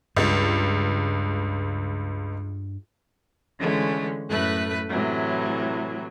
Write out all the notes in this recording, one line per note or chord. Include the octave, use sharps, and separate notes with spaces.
C#2 G2
D3 E3 G#3 A3 C#4
F#2 A2 A3 B4 F#6
A2 C3 E3 F#3